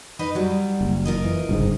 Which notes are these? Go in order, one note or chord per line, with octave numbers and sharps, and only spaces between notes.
D#4 B4 D#5
F#3 G3
F#1
F4 A#4 D#5
E3
G1 C#2 G#2